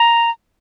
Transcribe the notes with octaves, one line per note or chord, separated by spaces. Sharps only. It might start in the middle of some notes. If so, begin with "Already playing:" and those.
Already playing: A#5